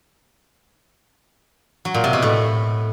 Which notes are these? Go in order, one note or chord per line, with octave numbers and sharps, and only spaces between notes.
F#3
A#2
C3
B2
A2